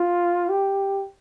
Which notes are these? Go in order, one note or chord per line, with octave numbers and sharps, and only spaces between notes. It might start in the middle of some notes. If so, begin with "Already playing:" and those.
Already playing: F4
G4